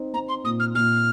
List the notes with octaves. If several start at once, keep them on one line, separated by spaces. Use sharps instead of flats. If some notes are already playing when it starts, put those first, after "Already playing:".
Already playing: C4 D#4
C4 A#5
C6
A#2 D#6
F6
A#2 F6